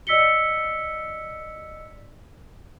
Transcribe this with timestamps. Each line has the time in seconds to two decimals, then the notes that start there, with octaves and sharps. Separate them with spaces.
0.07 D5 D#5 E6 B6 C#7 G7